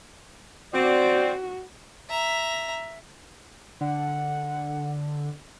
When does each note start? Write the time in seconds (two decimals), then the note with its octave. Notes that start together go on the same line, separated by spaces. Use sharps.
0.74 C4 F#4 D5
2.09 E5 A#5
3.81 D3 F#5